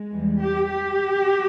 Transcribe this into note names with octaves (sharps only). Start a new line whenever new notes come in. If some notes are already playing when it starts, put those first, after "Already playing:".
Already playing: G#3
E2 E3 G3
G4
G4